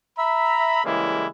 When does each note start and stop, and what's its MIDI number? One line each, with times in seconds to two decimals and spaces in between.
0.17 0.85 76
0.17 0.85 82
0.17 0.85 83
0.85 1.25 49
0.85 1.25 52
0.85 1.25 55
0.85 1.25 56
0.85 1.25 58
0.85 1.25 64